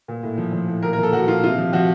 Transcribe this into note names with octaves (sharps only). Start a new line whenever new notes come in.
A#2
A2
F3
F3
A2
A#2 A#4
A#4
F3
A4
F3 F#4
A#2 F4
C3 F4
F3
F3 F#4